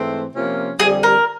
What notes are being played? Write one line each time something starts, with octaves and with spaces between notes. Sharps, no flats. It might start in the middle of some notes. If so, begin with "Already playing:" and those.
Already playing: G#2 E3 A3 C4
C3 F3 A#3 C#4 F4
F2 D3 G3 G#4
A#4